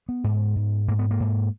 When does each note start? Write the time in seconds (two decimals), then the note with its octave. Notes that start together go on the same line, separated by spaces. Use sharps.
0.09 B3
0.24 G#2
0.56 G#2
0.88 G#2 A#3
0.99 B3
1.11 A#3
1.20 G#2